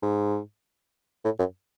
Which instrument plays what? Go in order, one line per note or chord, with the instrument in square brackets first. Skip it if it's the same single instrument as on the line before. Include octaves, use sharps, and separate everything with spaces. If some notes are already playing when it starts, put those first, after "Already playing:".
[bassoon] G#2
A2
F#2